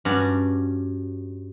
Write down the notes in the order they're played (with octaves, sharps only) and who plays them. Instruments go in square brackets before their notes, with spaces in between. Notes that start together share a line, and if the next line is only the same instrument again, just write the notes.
[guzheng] G2 C#4 F#4 D5